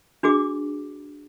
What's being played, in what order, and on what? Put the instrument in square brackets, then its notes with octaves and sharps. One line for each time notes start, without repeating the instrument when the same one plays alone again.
[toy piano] D4 F#4 G#4 D6